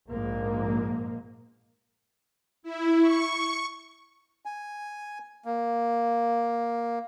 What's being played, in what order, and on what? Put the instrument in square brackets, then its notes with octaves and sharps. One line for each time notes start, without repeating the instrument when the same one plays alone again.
[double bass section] A#1 G#2 A#3
[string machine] E4
C#6
[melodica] G#5
A#3